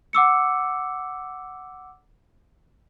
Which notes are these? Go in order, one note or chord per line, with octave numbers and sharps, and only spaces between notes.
F#5 D6 E6 C#7